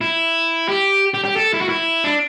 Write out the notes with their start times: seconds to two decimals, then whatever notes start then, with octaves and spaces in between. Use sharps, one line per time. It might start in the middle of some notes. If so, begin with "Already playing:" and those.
0.01 E4
0.69 G4
1.14 G4
1.25 G4
1.36 A4
1.54 E4
1.61 F#4
1.69 E4
2.04 D4